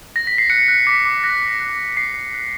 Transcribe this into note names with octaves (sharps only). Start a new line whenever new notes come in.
A#6
B6
C7
F#6 C#7
F#6
D6 B6
D6
F#6 A#6
D6
F#6
D6
F#6 C7
F#6
F#6